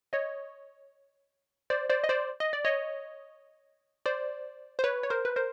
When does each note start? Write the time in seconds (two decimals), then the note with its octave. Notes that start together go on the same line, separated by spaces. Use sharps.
0.13 C#5 D#5
1.70 C5 D5
1.90 C5 D5
2.04 D#5
2.09 C5 D5
2.40 D#5
2.53 D5
2.65 C#5 D#5
4.06 C5 D5
4.79 C5
4.84 B4 C#5
5.03 C#5
5.10 A#4 C5
5.25 B4
5.36 A#4 C5